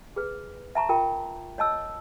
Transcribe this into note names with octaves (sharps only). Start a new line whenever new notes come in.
G#4 B4
E5 A5 A#5 C#6
F4 A#4 G5
C#5 D#5 A5 E6